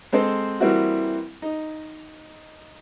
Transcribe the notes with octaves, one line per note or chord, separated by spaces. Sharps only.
G#3 C4 A4 C5
E3 G3 A#3 C4 E4 F#4
D#4